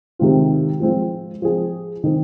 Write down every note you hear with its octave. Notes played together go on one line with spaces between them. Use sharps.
C3 D#3 G#3 C4 F4
F3 G#3 C4 F4
F3 C4 G#4
D#3 C4 D#4